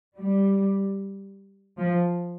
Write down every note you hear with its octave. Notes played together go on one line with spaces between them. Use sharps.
G3
F3